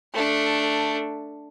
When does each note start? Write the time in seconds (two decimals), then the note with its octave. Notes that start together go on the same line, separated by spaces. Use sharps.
0.13 A3 D4